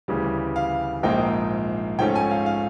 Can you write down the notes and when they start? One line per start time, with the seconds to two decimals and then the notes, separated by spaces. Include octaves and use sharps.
0.08 D2 C#3 E3 G3
0.56 F5
1.03 A#1 G#2 F3 A#3 D#4 G5
1.99 G#2 F3 A3 C#4 G5
2.16 G#5
2.31 F5
2.46 F5